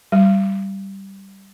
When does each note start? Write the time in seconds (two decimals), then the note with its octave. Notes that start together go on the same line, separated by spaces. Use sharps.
0.12 G3